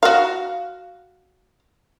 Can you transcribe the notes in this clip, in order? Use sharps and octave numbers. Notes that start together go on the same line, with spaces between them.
F#4 F5